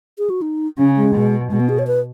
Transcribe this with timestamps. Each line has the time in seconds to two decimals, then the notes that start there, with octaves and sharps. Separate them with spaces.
0.18 G#4
0.30 F#4
0.42 D#4
0.78 C#3 C#4
0.97 G#3
1.15 B2
1.51 B2 G#3
1.60 B3
1.69 G#4
1.79 C#5
1.87 B4